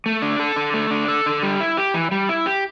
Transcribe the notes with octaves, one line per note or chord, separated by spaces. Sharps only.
A3
D4
A4
D3
A3
D4
A4
D3
G3
E4
G4
E3
G3
E4
G4